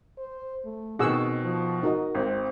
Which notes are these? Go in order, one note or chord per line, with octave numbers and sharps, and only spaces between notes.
C5
A3
B2 D#3 C4 G#4 F#5 E6
F3
D#4 F#4 A#4 D#5
G#1 C4